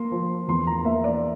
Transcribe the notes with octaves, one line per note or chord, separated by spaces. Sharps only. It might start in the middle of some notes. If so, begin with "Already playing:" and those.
Already playing: A#3 C6
F3
E2 C6
A#5
A#3 E5
D5